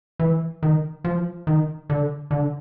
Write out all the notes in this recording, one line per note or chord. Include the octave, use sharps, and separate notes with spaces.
E3
D#3
F3
D#3
D3
D3